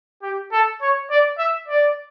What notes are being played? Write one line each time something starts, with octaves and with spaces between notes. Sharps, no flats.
G4
A4
C#5
D5
E5
D5